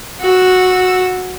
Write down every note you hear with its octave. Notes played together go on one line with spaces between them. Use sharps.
F#4 E6